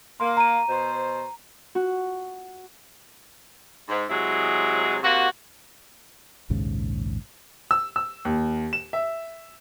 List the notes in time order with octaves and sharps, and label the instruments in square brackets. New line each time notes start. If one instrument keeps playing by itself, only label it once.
[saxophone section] A#3 [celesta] C6
[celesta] A#5 D#7
[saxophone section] B2 C5
[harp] F#4
[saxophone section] G#2
C3 F#3 G#3 E4 G#4
C3 A#3 F#4
[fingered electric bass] A#1 D#2 G#2 C#3
[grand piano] E6
E6
D#2
E7
E5